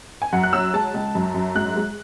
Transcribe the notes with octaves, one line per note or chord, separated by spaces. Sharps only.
G#5
F#2 F#5
F#6
F#3 E6
G#3 A5
C#2
F#2
F#2
G#2 F#6
G#3